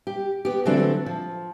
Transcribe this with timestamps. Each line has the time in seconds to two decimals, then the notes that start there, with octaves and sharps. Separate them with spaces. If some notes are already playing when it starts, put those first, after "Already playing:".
0.07 G4
0.45 B3 G4
0.65 D3 E3 F#3 A3 C4 D4
1.06 F3